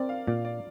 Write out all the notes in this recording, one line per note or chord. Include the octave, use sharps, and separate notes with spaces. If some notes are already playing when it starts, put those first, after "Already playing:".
Already playing: C4 A#4 D5
F5
A#2 D5
D5